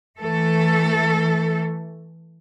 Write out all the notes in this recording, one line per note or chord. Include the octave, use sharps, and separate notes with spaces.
E3 A3 A4